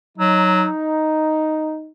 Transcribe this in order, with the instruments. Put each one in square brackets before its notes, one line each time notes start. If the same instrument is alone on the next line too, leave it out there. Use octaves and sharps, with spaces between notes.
[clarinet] F#3 [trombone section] D#4